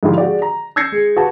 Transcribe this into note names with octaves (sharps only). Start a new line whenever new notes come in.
G#2 D3 F3 E4 F4 G4
G#3 F#4 G4 D5
A#5
E6 G6 G#6 A#6 C7 C#7
G#3
F#4 G4 B4 A5